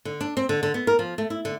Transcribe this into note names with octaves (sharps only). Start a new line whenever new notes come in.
D3
D4
C4
D3
D3
B3
A#4
F3
A3
E4
D3